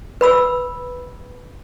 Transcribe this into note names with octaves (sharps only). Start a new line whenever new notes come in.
B4 B5 E6